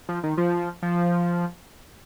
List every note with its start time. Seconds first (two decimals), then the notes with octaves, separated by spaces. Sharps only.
0.09 F3
0.23 D#3
0.37 F3
0.82 F3